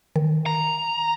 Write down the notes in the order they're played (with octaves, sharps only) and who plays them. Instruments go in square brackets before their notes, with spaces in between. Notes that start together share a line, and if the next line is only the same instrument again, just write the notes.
[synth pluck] D#3
[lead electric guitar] A#5